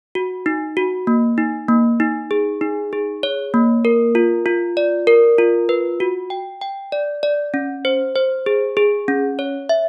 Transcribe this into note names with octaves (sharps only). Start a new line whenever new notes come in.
F#4
D#4
F#4
A#3
D#4
A#3
D#4
G#4
D#4
G#4
C#5
A#3
A#4
F4
F4
D5
A#4
F4
B4
F#4
G5
G5
D5
D5
C#4
C5
C5
G#4
G#4
C#4
C#5
E5